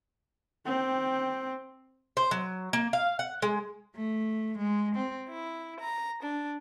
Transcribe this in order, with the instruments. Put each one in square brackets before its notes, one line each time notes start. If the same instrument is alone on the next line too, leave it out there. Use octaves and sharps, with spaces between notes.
[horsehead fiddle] C4 G5
[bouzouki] C5
F#3
A#3
F5
F#5
G#3
[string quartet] A3
G#3
C4
E4
A#5
D4